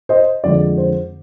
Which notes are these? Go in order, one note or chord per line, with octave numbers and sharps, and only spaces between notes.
C5 D#5
F2 D3 F3 G#3 D5
C5